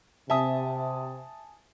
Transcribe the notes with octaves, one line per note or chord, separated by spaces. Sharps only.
C3 E5 G#5 A5 D#6